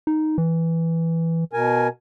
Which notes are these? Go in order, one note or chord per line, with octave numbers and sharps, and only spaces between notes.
D#4
E3
B2 A#4 G#5